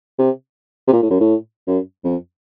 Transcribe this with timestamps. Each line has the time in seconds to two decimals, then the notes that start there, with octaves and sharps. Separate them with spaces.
0.18 C3
0.87 C3
0.93 A#2
1.02 A2
1.10 F#2
1.20 A2
1.67 F#2
2.04 F2